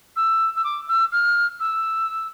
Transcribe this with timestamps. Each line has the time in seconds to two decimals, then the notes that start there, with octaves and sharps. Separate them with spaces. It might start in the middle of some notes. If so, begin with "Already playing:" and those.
0.16 E6
0.55 E6
0.64 D6
0.87 E6
1.12 F6
1.60 E6